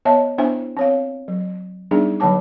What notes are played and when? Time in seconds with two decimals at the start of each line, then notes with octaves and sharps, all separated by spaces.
0.05 B3 C#5 D#5 E5 A5
0.38 B3 D4 E4 C5 E5 G#5
0.77 C4 C#5 F5
1.28 F#3
1.91 G3 B3 D4 D#4 G#4 D5
2.20 D3 F#3 A#3 C#5 A5 D6